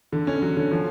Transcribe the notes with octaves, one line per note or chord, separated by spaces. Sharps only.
D3
C#4
F#3
D3
F3